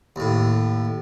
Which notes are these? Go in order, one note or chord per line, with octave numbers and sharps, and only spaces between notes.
D#2 A2